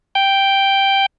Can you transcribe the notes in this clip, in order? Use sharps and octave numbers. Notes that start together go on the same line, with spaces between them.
G5